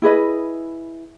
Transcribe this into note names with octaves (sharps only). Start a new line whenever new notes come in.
E4 G#4 B4 D#5